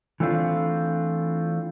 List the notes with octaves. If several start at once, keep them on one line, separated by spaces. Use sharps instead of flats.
E3 A3 C4 D4 F4